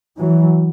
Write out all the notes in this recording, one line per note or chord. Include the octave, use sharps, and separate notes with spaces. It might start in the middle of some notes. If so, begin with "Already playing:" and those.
E3 F#3